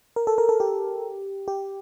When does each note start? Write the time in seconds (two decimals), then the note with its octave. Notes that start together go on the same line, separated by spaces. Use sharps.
0.16 A#4
0.27 A4
0.38 A#4
0.49 A4
0.60 G4
1.48 G4